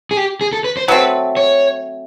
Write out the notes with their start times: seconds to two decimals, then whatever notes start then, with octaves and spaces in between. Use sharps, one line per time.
0.11 G#4
0.17 G4
0.41 G#4
0.53 A4
0.64 B4
0.77 C5
0.88 F#3 A3 C4 B4
1.37 C#5